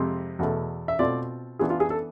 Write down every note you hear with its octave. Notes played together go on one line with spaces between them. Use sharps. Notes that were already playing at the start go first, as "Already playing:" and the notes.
Already playing: F2 C3 G#3 C4 F4
E2 B2 A3
E5
B2 A3 C4 F4 D5
E3 B3 D4 F4 G#4
F4
G#4
A4